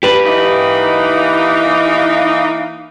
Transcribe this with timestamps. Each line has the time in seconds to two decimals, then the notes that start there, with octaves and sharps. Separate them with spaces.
0.03 G4 B4
0.26 E3 A#3 D#4